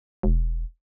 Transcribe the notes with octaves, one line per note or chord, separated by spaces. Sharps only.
E1